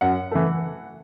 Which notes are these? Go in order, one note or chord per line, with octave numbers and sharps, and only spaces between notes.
F#2 F#5
E3 A3